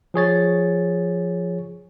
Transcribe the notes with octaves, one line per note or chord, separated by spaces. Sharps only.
F3 G#4 C#5 A6